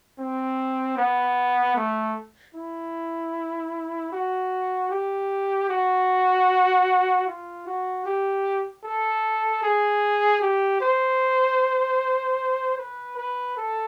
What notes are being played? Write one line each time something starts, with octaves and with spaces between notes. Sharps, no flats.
C4
B3
A3
E4
F#4
G4
F#4
F4
F#4
G4
A4
G#4
G4
C5
B4
B4
A4